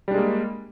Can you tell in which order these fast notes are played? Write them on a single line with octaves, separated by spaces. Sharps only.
G3 D4 G#3 A#3